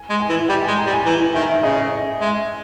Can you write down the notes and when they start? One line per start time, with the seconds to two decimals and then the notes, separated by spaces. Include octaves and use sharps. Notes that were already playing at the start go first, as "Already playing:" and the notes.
Already playing: G#5
0.10 G#3
0.20 G#5
0.29 E3
0.39 E5
0.48 G3 G5
0.63 G#3 G#5
0.78 A#5
0.87 G3
0.92 G#5
1.05 E3 A#5
1.20 G#5
1.34 D#3 E5
1.50 E5
1.63 C#3 D#5
2.21 G#3 E5